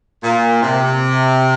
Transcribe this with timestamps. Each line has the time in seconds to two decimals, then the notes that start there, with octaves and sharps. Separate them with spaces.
0.23 A#2
0.62 C3